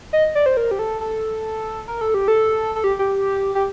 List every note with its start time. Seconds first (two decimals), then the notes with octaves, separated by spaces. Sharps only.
0.13 D#5
0.35 D5
0.46 C5
0.57 A#4
0.71 G4
0.79 A4
1.01 A4
1.88 A#4
2.01 A4
2.14 G4
2.28 A4
2.76 A4
2.84 G4
2.99 G4
3.55 G4